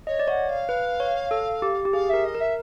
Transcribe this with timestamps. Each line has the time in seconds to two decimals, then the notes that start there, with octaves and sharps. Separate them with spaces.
0.07 C#5 D#5
0.19 D5
0.28 C#5 F#5
0.48 F5
0.69 B4
1.00 C#5
1.31 A4
1.62 G4
1.85 G4
1.93 G#4 F5
2.09 A#4 E5
2.24 D#5
2.35 A#4
2.40 E5